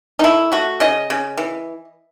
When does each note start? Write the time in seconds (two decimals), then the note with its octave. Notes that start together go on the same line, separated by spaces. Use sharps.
0.19 D#4
0.23 A3 E4
0.52 A3 F#4
0.80 C#3 D#5
1.10 C#3
1.37 E3